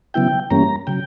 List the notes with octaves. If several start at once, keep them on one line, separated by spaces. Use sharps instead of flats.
C#3 F#3 B3 E4 G5
G2 E3 G3 A#3 C#4 A#5
C#3 F#3 G5